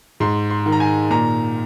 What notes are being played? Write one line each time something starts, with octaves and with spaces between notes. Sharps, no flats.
G#2 C6
C6
D#3
A#5
G#5
A#2 A#5